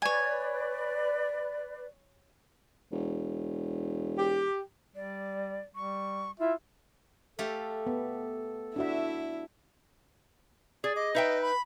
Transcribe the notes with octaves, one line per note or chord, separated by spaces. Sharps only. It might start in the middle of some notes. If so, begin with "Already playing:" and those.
B4 C#5 D5 G#5
E1
G4
G3 D5
G3 C#6
E4 F4 E5
A3 G4 A4 F5
B3
D4 E4 F#4 E5
G#4 D5
D#5 D6
D#4 B4 E5 G5
B5